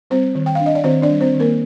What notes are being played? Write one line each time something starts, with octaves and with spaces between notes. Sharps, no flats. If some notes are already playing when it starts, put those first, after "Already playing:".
G3 C4 C5
D#3
G5
F5
D4
D#5
D5
D#3 C4 C5
D4 D5
G3
C4 C5
D#3
A#3 A#4